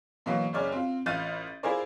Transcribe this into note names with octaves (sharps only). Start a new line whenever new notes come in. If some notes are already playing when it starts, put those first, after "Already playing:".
B2 E3 F#3 A#3
F#1 C#3 C#5 D5 F6
C4 F4
A1 F4 F6 G6 A6 D#7
E4 F4 G#4 A#4 C5 D5